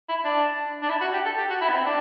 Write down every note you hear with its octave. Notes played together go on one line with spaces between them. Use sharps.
E4
D4
D4
E4
F#4
G4
A4
G4
F#4
E4
B3
C4
D4